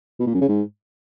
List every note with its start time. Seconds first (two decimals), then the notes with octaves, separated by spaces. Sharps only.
0.20 B2
0.27 A#2
0.34 F#2
0.41 C#3
0.49 G#2